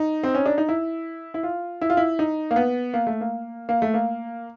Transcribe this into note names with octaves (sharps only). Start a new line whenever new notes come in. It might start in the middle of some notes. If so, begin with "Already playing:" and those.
Already playing: D#4
C4
C#4
D4
D#4
E4
E4
F4
E4
F4
E4
D#4
A#3
B3
A#3
A3
A#3
A#3
A3
A#3